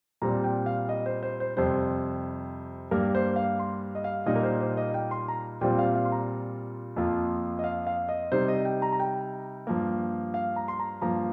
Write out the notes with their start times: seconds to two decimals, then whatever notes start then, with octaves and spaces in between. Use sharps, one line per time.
0.22 A#2 G3 C4 A#5
0.44 G5
0.66 F5
0.89 D#5
1.06 C5
1.23 C5
1.40 C5
1.57 F2 C3 G3 C5
2.91 G2 G3 A#3 A#4
3.15 C5
3.36 F5
3.59 C6
3.95 D#5
4.04 F5
4.26 A#2 G3 A#3 D#4 D#5
4.36 A#4
4.43 C5
4.60 C5
4.77 D#5
4.94 G5
5.11 C6
5.28 A#5
5.61 A#2 G3 C4 F4 G5
5.78 F5
5.95 F5
6.05 C6
6.12 A#5
6.96 F2 F3 A#3 F4
7.59 D#5
7.64 F5
7.87 F5
8.09 D#5
8.32 C3 G3 D#4 C5
8.48 D#5
8.65 G5
8.82 A#5
8.92 A#5
9.00 G5
9.67 G2 F3 A#3
10.34 F5
10.56 A#5
10.68 C6
10.79 A#5
11.01 G2 F3 A#3 A#5